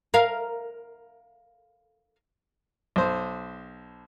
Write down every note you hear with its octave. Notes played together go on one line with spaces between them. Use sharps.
A#4 F5
B1 C5